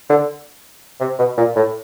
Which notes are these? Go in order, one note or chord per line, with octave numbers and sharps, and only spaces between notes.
D3
C3
B2
A#2
A2